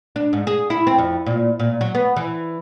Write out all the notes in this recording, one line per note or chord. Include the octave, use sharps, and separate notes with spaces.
D4
G#2
G#4
E4
C4
F2
A#2
A#2
F#3
B3
E3